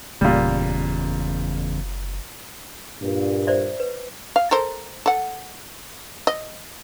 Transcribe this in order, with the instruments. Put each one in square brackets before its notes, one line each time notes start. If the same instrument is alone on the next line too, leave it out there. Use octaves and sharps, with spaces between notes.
[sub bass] F#1 [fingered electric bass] E2 C#3 [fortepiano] A#2 G3
[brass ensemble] G2 A#2
[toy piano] C5 D5 E5
B4
[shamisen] F5
A4 A#4 C5
A4 F#5
D#5